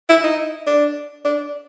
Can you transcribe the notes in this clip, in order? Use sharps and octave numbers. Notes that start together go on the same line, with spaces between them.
E4
D#4
D4
D4